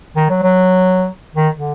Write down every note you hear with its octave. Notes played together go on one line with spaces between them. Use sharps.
D#3
F#3
F#3
D#3
D3